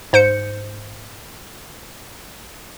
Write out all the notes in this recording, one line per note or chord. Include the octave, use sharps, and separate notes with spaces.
G#2 C5 G6 C#7